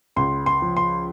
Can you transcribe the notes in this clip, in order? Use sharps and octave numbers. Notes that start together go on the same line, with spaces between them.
C#2 C6
C6
F3
C6